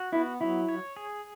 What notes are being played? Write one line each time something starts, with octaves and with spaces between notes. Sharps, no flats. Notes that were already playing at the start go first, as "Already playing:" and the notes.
Already playing: F#4
B3 E4
F#3 E4
C#5
G#4